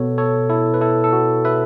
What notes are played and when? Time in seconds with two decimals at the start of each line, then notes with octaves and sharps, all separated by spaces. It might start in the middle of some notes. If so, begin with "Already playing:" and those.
Already playing: B2 B3 A4 C#5
0.18 A4 C#5
0.50 E4 A4
0.74 B4
0.81 E4 A4
1.04 A4
1.13 F#4
1.45 B4 E5